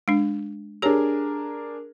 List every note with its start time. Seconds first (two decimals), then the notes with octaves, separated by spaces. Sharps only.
0.08 G#3 D4
0.82 D4 G4 G#4 A#4 C#5